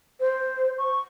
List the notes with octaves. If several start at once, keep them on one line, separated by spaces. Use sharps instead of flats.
C5
C#6